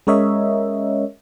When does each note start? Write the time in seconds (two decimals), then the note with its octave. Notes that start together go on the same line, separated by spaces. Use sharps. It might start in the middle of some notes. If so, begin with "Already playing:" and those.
0.07 G#3 C#4 A#4 C#5 D#5 E5